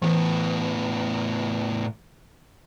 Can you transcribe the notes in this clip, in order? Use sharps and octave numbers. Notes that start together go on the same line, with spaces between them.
A2 E3 B3